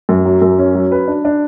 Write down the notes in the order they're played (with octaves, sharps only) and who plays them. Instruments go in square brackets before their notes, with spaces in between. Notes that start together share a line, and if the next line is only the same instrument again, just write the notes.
[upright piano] F#2
F#3
F#2
C#4
F#3
B4
D4
D4